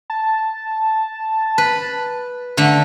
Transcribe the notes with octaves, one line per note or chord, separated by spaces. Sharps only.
A5
B4
D3 A3